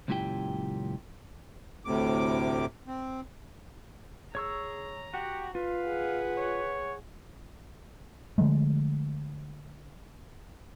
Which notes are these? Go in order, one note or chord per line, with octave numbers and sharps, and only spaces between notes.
C#2 F#2 A#2 E4 G4 G5
D2 A2 C3 D6
C4
G#4 C#5 A#5 C#6 E6
F#4 G4 F#5
F4 B4 F5
G#4 F#5
C#5
D3 F3 G#3 A3